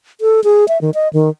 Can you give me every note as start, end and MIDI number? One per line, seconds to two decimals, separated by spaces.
0.21 0.40 69
0.44 0.67 68
0.68 0.80 76
0.81 0.90 51
0.94 1.08 75
1.13 1.30 51